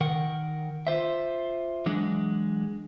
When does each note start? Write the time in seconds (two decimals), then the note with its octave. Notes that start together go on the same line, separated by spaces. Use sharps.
0.01 D#3 A#4 F#5
0.87 F4 C5 E5
1.86 E3 F#3 G#3 D4